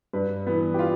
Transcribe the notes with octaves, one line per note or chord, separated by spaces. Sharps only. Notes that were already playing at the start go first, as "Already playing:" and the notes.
G2 B4
E3 B3
G4
F4